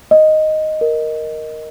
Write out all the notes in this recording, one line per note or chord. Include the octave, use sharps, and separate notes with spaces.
D#5
A#4